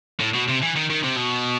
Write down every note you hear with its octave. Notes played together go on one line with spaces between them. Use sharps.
A2
B2
C3
E3
D#3
D#3
C3
B2